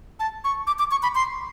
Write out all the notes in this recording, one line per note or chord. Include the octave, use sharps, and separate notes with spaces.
A5
C#6
D6
D6
C#6
B5
C6